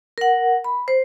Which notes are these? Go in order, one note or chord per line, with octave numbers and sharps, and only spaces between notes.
A#4 F#5
B5
C5